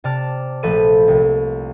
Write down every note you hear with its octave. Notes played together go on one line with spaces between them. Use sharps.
C3 D5 A5 F6
A#1 F3 A3 A4 B4 D#7
C2